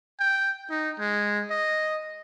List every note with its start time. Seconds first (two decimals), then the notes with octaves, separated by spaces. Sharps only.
0.20 G5
0.70 D#4
0.99 G#3
1.50 D#5